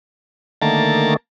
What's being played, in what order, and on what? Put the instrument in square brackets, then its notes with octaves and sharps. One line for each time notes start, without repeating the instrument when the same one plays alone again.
[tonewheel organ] D3 D#3 A3 [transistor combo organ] A#3 A5